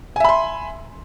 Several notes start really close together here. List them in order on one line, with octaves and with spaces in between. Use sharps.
G#5 E5 B5 C6